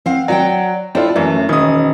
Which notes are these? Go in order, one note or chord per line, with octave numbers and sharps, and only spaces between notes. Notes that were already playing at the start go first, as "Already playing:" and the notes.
C4 F5 F#5
F#3 D5 F#5 G5
C4 D4 E4 F4 A4
F#2 E3 A3 C#4
E1 D#3 C#4 D#6